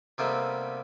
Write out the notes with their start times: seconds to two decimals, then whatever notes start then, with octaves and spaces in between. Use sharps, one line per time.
0.18 C3 G3 A#3 B3 D#4 A4